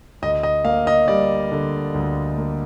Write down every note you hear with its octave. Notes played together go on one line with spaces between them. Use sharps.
D2 D#5
D#5
A#3 F5
D#5
G3 D5
D3
D2
A#3